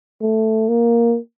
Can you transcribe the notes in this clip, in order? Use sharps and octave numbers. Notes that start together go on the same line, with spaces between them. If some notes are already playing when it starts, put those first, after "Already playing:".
A3
A#3